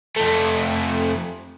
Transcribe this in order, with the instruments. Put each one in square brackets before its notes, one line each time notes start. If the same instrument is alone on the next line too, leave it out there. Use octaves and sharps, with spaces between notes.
[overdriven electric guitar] F2 A3